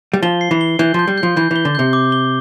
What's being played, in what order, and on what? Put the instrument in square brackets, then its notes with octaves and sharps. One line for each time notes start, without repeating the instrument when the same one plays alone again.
[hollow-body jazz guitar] G3
[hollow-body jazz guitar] F3 [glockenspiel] G7
[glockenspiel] C7
[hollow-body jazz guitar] E3
[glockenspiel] G7
[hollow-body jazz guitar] E3 [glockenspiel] G6
[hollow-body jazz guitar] F3 [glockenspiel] G6
[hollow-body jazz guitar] G3
[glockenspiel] G6
[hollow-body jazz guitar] F3
[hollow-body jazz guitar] E3 [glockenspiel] G6
[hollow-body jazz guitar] E3 [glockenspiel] G7
[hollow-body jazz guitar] D3
[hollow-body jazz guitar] C3 [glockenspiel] G6
[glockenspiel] D6
G7